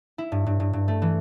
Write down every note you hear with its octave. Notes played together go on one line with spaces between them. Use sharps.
E4
G2
G2
G2
G2
A3
E3